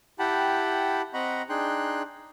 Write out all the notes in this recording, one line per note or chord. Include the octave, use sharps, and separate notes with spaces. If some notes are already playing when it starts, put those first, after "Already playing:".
E4 G4 F#5 G5 A5 B5
C4 D#5 F#5 A#5 B5 C#6
D4 D#4 G#4 G5 C6 F#6